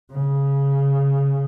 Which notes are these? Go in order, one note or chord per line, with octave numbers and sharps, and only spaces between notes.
C#3